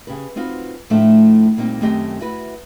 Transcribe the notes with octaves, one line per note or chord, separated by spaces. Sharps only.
C#3 G4 B4
C4 D#4 F4 F#4 B4
A2 F3 A3 D4 A4 E5
A#2 G3 A#3 C4 D#4
F#2 D#3 A3 C4 G4 D#5
E4 F#4 B4